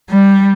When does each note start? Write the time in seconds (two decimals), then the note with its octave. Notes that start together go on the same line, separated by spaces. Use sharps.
0.10 G3